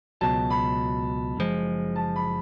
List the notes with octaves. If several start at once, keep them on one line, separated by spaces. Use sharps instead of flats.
C#2 B2 F#3 A5
B5
F#1 F#2 F3 G#3
A5
B5